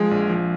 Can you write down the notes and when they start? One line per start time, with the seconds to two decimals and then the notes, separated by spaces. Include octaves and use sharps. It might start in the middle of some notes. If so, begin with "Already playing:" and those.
Already playing: F3 G#3 G#4
0.11 A#1
0.30 F3